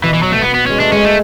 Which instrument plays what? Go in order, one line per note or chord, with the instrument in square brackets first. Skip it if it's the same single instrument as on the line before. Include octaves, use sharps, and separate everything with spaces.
[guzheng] B2 [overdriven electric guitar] E3
[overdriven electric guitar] E3
F#3
A3
B3
B3
[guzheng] G#3 [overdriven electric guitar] C#4
[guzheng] A3 [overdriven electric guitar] D4
[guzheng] G#3 [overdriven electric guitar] C#4
[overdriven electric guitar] A3